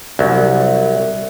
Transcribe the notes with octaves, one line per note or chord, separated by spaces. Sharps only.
C2 F#3